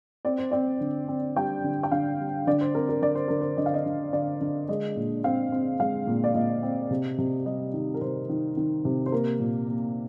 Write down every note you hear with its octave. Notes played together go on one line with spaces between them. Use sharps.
C4 D5
C5
C4 D5
D3
C4
G3 G5
D3
G5
D3 F5
G3
D3 D5
C5
C4 A#4
A#4
D3 D5
C5
D3 A#4
C5
D3 D#5
F5
D#5
D3
D3 D5
D3
G#3 D#5
A#2
C4 F5
C4
G#3 F5
A#2
D5
A#2 D#5
C4
C3
C3
G3 D#5
D#3
A#4
C3 C5
D#3
D#3
C3
C5
A#3 A#4
A#2
A#3